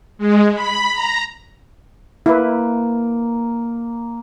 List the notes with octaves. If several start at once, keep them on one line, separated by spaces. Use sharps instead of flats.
G#3
B5
A#5
A#3 E4 B4